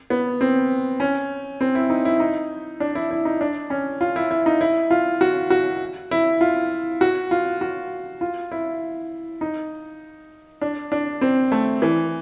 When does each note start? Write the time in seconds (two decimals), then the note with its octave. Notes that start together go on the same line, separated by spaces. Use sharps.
0.10 B3
0.41 C4
1.00 C#4
1.61 C4
1.75 E4
1.90 D#4
2.05 E4
2.20 D#4
2.80 D4
2.95 E4
3.11 E4
3.25 D#4
3.41 D4
3.70 C#4
4.01 F4
4.16 E4
4.31 E4
4.46 D#4
4.61 E4
4.91 F4
5.21 F#4
5.50 F#4
6.11 E4
6.41 F4
7.01 F#4
7.31 F4
7.61 F#4
8.21 F4
8.52 E4
9.41 D#4
10.62 D4
10.92 D4
11.21 C4
11.52 A3
11.82 E3